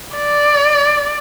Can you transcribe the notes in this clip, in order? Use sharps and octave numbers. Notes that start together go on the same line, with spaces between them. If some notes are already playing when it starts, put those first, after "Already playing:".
D5